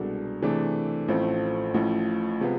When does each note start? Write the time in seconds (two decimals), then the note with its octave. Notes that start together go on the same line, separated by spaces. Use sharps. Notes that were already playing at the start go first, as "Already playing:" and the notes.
Already playing: C2 B2 G#3 D4 A4
0.42 C3 E3 A3 D4 G#4
1.08 A1 A2 F3 A3 C4
1.74 A1 A2 F3
2.41 C3 F3 G#3 B3